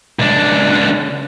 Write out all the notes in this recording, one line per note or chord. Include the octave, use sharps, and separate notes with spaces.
C#2 D4